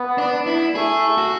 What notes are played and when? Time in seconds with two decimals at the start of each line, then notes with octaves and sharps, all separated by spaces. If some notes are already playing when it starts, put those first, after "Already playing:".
Already playing: B3
0.18 D4
0.47 E4
0.75 A3 G#4
1.18 F#4